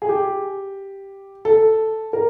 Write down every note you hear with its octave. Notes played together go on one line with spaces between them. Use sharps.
G#4
G4
A4
A#4